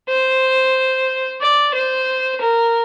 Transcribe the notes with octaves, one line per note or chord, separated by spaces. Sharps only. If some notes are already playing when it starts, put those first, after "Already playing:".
C5
D5
C5
A#4